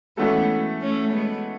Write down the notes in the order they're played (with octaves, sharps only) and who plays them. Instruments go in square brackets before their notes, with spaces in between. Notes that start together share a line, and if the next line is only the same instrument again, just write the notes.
[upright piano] E3 A3 C#4 F#4 A4 [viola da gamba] G#3 B3
[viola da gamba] A3 C#4
G#3 B3